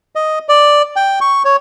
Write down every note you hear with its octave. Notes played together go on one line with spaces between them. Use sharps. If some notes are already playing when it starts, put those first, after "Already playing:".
D#5
D5
G5
C#6
C#5